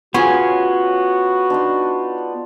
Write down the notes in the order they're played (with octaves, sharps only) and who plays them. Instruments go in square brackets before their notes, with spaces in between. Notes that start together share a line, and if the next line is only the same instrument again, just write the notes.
[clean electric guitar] B3 [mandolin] C#4 G#4 [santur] F4 C#5 [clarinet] F#4
[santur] D4 D#4 C6